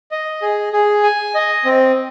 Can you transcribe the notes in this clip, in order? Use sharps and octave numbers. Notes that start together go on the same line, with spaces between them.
D#5
G#4
G#4
G#5
D#5
C4